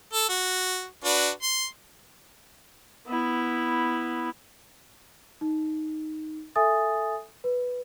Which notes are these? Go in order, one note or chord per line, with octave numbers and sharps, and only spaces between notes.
A4
F#4
D4 F#4 B4
C6
B3 E4
D#4
A4 E5 G#5 D#6 A6
B4